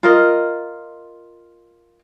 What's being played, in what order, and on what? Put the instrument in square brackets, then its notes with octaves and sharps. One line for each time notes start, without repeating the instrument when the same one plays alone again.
[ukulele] F4 A#4 D#5